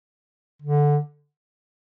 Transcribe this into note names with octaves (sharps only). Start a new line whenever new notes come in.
D3